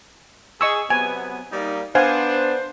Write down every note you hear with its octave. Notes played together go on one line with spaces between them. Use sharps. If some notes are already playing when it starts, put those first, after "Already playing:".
G#4 D#5 C#6 E6
C3 F#3 B3 G#5
G3 A#3 D#4
B3 D4 C5 F5 F#5 G#5